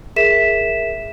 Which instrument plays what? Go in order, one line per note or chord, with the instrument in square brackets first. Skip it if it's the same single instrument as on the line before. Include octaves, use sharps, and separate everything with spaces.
[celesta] G#4 A#4 E5 B6 E7